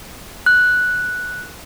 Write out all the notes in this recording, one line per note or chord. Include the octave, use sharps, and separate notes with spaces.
F#6